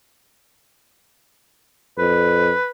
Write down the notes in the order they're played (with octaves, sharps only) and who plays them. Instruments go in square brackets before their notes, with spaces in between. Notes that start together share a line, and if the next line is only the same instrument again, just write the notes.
[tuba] F2 [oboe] B4